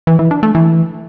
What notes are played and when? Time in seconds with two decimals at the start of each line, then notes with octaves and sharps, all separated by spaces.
0.07 E3
0.19 E3
0.31 D4
0.43 A3
0.55 E3